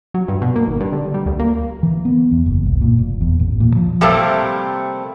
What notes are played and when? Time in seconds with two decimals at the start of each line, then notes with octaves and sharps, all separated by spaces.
0.14 F#3
0.28 G2
0.42 B2
0.56 A#3
0.68 G#1
0.80 G2
0.92 D3
1.14 G3
1.26 D2
1.39 A#3
1.83 E3
2.05 B3
2.31 E2
2.46 F#1
2.66 C2
2.82 A#2
2.99 F1
3.21 E2
3.40 A1
3.60 A#2
3.76 F3
4.01 C3 G3 A3 A#3 C4